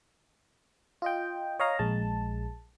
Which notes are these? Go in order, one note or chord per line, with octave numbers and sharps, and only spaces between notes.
F4 D#5 G5
C#5 D#5 F5 A#5
A#1 G#3 A5